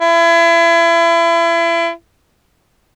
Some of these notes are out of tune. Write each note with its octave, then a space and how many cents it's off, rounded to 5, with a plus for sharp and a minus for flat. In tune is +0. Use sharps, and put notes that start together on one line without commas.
E4 +35